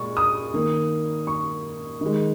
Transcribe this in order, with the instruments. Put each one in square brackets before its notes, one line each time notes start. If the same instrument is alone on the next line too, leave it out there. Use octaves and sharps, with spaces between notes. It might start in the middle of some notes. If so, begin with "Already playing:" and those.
Already playing: [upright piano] A#2 G#3 C#6
D#6
D#3 A#3
C#6
D#3 G#3